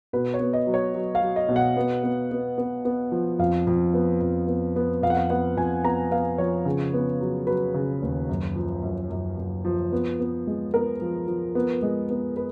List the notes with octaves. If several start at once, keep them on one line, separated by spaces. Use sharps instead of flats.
B2 B4
C#5
B3
D#5
F#3
C#5
F#3
F5
F#3
D#5
B2
F#5
B3
B3
B3
B3
B3
F3
F2 F5
F2
B3
F2
B3
B3
F2 F5
F#5
F5
B3 F#5
F2 G#5
B3 A#5
B3 F5
F3 C#5
C#3
B3
F#3
F#3 B4
C#3
D#2
F#2
F3
F#2
F#2
F#2
F3
B3
B3
G#3
B3 A#4
F3
F3
B3
G#3
B3
B4